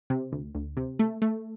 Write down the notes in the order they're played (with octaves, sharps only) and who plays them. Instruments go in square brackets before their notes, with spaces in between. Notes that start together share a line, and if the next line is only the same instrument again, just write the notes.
[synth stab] C3
D2
D2
C3
A3
A3